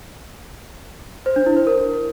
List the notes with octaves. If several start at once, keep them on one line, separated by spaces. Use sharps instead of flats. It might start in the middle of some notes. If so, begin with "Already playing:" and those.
C5
D4
E4
C5
A#4